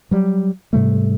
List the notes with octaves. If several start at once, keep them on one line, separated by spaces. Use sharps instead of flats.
F#3 G3
G#2 C3 G3 A3